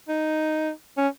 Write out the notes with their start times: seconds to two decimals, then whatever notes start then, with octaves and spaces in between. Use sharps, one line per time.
0.08 D#4
0.97 C#4